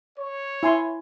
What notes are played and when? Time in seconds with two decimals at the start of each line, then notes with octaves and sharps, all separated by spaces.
0.19 C#5
0.63 E4 G#5 C6